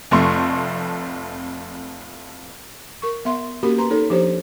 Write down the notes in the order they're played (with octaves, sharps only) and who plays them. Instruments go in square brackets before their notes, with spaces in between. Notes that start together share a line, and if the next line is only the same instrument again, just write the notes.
[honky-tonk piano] F1 F2 A3 C6 C#6
[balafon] A#4 C#6
B3 E5 C6
A#3 C#4 F#4 G4 A#4 B5
B4 A#5 C6
D#4 A4 C#5
F3 D4 G4 C5